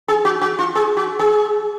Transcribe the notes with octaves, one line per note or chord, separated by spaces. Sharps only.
G#4
F#4
F#4
F4
G#4
F#4
G#4